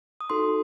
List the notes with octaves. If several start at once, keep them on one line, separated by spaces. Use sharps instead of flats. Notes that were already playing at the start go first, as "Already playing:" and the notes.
D#6
D#4 F#4 A4 C6